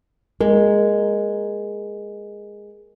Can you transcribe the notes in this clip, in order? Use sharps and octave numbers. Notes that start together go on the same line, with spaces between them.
G#3 A#4